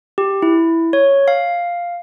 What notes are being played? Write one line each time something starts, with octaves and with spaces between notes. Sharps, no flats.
G4
E4
C#5
F5